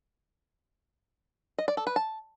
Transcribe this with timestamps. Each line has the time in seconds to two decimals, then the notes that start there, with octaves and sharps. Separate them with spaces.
1.58 D#5
1.68 D5
1.77 A4
1.87 B4
1.96 A5